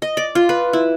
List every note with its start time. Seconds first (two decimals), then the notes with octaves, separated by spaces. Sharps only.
0.02 D#5
0.17 D5
0.35 F4
0.49 B4
0.73 E4